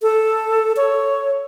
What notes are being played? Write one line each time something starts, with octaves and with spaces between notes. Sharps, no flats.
A4
C#5